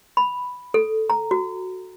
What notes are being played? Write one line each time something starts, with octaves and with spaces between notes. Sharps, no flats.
B5
A4
A#5
F#4